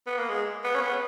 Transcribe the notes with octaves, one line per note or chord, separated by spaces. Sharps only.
B3
A#3
G#3
B3
C#4
B3